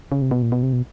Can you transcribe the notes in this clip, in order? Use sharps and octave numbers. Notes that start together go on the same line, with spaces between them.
C#3
C3
B2
A#2
B2
C3
B2